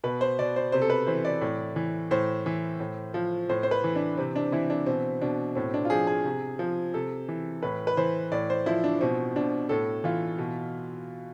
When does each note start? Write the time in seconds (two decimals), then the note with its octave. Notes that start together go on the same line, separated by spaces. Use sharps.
0.04 B2 B4
0.21 C5
0.39 B2 D5
0.56 C5
0.72 C3 C5
0.82 A4
0.90 B4
1.07 E3 C5
1.25 D5
1.41 A2
1.76 E3
2.11 A2 C5
2.46 E3
2.80 A2
3.14 F3
3.49 A2 C5
3.63 C5
3.71 B4
3.84 E3
3.95 D4
4.17 C3 C4
4.36 D4
4.52 E3 E4
4.70 D4
4.86 B2 C4
5.21 B2 D4
5.55 A2 C4
5.74 D4
5.85 F4
5.90 F3 G#4
6.07 G#4
6.25 C3
6.59 F3
6.94 C3 A4
7.29 E3
7.63 A2 B4
7.87 B4
7.97 E3 C5
8.32 A2 D5
8.50 C5
8.66 F3 E4
8.84 D4
9.01 B2 C4
9.36 B2 D4
9.69 A2 A4
10.04 E3 F4
10.38 B2